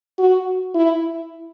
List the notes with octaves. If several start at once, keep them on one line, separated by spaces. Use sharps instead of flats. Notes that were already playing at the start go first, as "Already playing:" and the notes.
F#4
E4